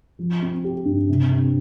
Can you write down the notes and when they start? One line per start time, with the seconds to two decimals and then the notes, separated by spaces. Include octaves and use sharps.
0.19 F3
0.42 C4
0.64 G4
0.86 G2
1.09 C3
1.31 C4